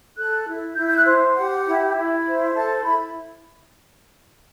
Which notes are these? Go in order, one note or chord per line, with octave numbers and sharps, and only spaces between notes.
A4 F#6
E4
E4 G6
G6
F#6
C5
G4 F#5
E4
E4
C5
A4 A5
E4 B5